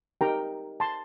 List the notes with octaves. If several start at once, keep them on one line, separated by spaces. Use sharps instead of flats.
D#4 G4 A#4 G5 A#5
A5 C6